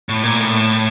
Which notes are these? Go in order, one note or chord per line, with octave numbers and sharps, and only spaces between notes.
A2
A#2
A2